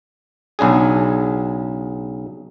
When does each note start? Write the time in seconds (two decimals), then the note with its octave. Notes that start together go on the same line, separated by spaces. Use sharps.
0.59 B1 C#3 D4 G#4